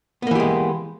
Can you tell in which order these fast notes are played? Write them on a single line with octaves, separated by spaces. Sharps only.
B3 A#3 E3 G4 G#3